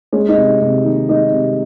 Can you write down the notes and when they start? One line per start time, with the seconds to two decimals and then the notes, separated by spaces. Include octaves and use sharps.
0.13 G#3 C#4
0.29 D#4
0.37 C3
0.61 C3
0.85 D#3
1.09 G#3 D#4
1.33 C3